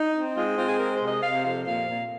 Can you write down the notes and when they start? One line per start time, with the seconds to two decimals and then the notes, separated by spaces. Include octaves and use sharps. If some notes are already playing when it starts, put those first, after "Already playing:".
Already playing: D#4
0.14 C4
0.36 G#3 F4
0.57 C4 F4
0.69 G#4
0.79 G#3 A#4
0.94 C5
1.01 C3
1.08 D#5
1.22 C3 F5
1.44 F2 F5
1.66 A#2 F5
1.88 A#2